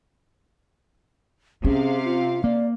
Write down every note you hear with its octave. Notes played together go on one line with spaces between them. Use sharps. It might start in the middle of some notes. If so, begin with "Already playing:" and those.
C3 C#4 G#4 F5
F4
A#3 D5